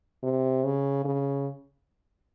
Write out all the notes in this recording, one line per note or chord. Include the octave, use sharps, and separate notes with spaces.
C3
C#3
C#3